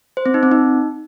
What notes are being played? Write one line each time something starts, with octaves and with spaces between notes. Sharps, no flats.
C5
C4
D#4
C4
D#4